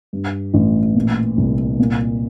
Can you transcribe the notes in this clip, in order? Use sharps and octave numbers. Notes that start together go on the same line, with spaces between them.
G2
A1
A#2
C2
A#2